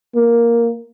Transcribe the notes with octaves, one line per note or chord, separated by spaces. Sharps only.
A#3